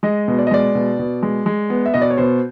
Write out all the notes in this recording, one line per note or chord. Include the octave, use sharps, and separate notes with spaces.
G#3 D#5
B2
D5
D#5
G#3 D5
B2
B2
G#3
G#3
B3
E5
B2 D#5
D5
C#5
B2 C5